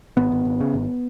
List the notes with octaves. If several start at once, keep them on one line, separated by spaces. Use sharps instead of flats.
G#1 B3
G#1
G#1
C#3
G#1